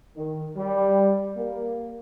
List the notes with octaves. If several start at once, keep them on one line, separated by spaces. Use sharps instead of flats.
D#3
G3
A#3